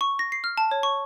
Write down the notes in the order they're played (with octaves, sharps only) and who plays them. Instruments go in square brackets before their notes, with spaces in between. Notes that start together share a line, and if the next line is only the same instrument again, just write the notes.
[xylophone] C#6
A#6
C7
F6
A5
C#5
C#6